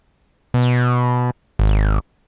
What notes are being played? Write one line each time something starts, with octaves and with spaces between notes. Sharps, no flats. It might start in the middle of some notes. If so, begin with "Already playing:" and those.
B2
G#1